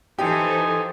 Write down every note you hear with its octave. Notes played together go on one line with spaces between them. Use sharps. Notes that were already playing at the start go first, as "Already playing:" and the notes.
E3 F3 D#4 G4 A4 C5 G#5